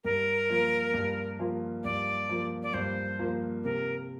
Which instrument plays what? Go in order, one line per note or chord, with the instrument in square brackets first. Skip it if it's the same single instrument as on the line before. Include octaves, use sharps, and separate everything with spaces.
[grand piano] G2 [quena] A#4
[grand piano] F3 A#3 F4
G2
F3 A#3 F4
[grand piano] G2 [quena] D5
[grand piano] F3 A#3 F4
[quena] D5
[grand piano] G2 [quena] C5
[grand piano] F3 A#3 F4
[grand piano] C3 [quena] A#4